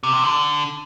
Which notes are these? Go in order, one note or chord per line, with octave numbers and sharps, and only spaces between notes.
C3
C3
D3